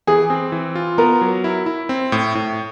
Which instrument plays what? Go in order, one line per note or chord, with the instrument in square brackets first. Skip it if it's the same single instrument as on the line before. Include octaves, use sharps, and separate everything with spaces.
[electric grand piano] E3 [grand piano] G#4
[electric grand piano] C4
E3
F4
[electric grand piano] B3 [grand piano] A#4
[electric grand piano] F#3
E4
E4
C4
A2
A2